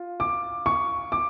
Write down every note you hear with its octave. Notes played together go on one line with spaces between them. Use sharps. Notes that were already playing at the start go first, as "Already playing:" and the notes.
Already playing: F4
D6
C#6
D6